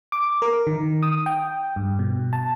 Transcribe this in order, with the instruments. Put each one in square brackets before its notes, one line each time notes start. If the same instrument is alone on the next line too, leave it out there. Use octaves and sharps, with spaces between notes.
[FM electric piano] D6
A#4
D#3
D#6
G5
G2
B2
A5